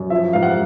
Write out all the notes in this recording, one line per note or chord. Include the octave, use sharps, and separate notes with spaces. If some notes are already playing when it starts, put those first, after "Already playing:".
Already playing: F#2
F3 E5
G#2 F5
F#5